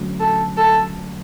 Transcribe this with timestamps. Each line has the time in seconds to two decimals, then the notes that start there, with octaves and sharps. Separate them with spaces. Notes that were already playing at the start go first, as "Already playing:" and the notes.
Already playing: D3 F#3 A3 C#4
0.20 A4
0.57 A4